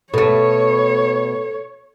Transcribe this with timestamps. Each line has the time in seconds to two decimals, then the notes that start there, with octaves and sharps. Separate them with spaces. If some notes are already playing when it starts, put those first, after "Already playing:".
0.14 B2 A3 A4 C#5